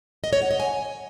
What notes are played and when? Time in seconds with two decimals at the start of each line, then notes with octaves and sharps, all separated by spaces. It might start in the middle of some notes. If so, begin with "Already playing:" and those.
0.24 D#5
0.33 C#5
0.42 F#5
0.51 D#5
0.60 G#5